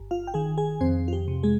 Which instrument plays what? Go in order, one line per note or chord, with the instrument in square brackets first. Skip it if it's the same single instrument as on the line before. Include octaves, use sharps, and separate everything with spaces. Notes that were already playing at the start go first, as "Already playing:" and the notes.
Already playing: [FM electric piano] G1
F4 F5
G5
D#3 G#4 G#5
G#4 G#5
F2 C4 C5
F4
G4
C3
G#3 G#4